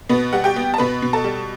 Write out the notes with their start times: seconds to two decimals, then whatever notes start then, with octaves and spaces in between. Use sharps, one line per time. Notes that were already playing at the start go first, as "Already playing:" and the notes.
0.09 B2 B3 B4
0.33 G3 F#5
0.44 G4 G5
0.56 B3
0.74 A5
0.78 B2 B4 B5
1.02 B2
1.13 A4 A5
1.24 G3